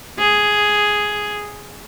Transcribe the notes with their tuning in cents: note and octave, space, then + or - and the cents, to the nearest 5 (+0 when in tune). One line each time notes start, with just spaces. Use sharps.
G#4 +5